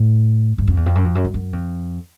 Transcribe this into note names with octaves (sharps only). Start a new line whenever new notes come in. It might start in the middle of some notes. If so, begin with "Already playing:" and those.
Already playing: A2
G2
F2
E2
F2
F#2
F2
F#2
G2
F#2
F2